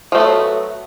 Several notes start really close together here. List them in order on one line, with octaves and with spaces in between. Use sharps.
F3 A3 B3 F#3